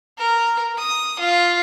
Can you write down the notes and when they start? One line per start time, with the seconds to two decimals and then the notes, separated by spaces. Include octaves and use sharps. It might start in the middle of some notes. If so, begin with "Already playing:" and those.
0.18 A#4
0.78 D#6
1.20 F4